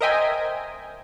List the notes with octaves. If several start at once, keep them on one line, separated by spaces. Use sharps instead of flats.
A#4 C5 D#5 E5 G5 G#5